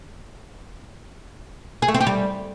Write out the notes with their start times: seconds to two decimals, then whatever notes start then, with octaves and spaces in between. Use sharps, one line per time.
1.82 G#4
1.88 A3
1.94 C4
2.01 G4
2.07 G3